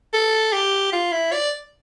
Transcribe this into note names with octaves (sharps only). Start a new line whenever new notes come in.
A4
G4
F4
E4
D5